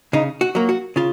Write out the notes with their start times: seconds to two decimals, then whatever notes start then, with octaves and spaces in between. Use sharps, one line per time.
0.13 C#3 D#4
0.41 F#4
0.55 F#3 A#3
0.69 F#4
0.96 C#3 F4